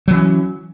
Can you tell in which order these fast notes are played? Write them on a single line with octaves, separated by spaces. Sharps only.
F#3 E3 C#4